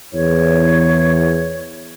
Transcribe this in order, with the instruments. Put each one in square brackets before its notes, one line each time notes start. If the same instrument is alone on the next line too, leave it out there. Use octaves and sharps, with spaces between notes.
[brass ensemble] E2 [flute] C#5